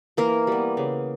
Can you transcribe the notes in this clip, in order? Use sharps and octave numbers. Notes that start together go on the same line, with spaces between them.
E3 A#3 A#4
G3 B3
C#3